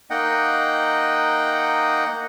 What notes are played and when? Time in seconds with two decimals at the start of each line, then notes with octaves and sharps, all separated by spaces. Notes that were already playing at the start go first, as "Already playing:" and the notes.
0.10 A#3 D#4 D#5 F#5 G5